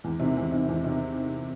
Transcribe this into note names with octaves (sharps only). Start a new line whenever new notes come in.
E2
C3 D#3
E2
C3 D#3
E2
C3 D#3